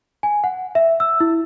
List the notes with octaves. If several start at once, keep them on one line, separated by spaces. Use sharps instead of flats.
G#5
F#5
E5
E6
E4